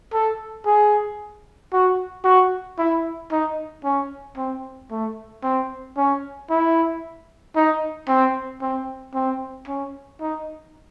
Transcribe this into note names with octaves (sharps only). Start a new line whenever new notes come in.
A4
G#4
F#4
F#4
E4
D#4
C#4
C4
A3
C4
C#4
E4
D#4
C4
C4
C4
C#4
D#4